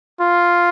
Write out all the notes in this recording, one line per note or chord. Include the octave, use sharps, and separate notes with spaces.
F4